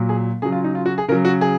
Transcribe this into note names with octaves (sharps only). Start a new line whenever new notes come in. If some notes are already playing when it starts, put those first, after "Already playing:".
Already playing: A#2 F#3
G#4
C#3 F#3 G#4
F4
D#4
F4
F#4
G#4
C#3 F#3 A#4
F#4
G#4